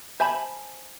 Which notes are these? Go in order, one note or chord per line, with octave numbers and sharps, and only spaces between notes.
C5 E5 G#5 A5 B5